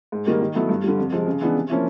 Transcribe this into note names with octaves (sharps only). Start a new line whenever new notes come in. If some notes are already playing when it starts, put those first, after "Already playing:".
G#2
D#3 G3 A#3
D#3
F#3 B3 E4 A4
G2
D3 G3
F2
C3 F3 G#3
C#3
E3 G#3 B3 D4
C3
F3 A#3 C#4 E4